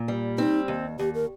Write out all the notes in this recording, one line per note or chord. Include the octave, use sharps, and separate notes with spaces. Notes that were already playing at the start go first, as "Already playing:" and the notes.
Already playing: A#2
G3
C4 D#4
D#2
D#2 G4
A#4